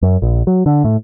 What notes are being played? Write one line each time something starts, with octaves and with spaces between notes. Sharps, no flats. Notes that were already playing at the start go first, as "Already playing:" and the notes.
F#2
A#1
F#3
D3
A2